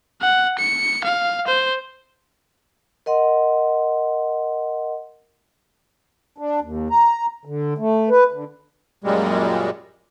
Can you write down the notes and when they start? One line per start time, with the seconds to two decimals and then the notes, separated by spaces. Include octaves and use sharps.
0.22 F#5
0.59 C#7
1.04 F5
1.47 C5
3.06 A#4 D#5 F#5 C6
6.38 D4
6.61 D#2
6.90 A#5
7.45 D3
7.78 A3
8.10 B4
8.32 D3
9.04 F#2 A#2 G3 G#3